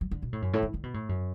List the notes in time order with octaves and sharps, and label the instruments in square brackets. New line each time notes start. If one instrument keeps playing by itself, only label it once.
[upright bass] F#3
D3
B2
A2
F#2
A2
E3
D3
B2
A2
F#2